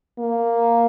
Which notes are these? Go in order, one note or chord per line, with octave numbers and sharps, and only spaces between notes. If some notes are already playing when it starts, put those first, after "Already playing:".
A#3